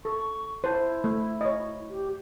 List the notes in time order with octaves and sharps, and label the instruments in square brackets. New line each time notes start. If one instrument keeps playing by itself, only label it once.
[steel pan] A4 [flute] C#6
[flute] E4 [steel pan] C5 A5
[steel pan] A3
C#5 D#5
[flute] G4